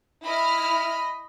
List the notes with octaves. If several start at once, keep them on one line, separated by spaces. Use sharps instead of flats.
E4 D#5 B5 F6